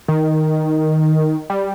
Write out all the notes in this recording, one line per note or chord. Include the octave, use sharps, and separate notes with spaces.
D#3
G3